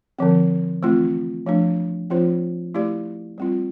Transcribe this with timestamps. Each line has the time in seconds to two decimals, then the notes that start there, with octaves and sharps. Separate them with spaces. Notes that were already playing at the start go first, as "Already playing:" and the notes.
0.19 D3 F3 C4
0.83 E3 A3 C4 F4
1.46 F3 A3 D4
2.10 F3 C4 F4 C5
2.74 A3 E4 G4 D5
3.38 G3 C4 F4